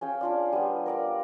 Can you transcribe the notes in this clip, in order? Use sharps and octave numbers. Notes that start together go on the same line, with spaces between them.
C#4 G#4 F5 G5
D4 F4 D5
G3 B3
A#4 D5 F5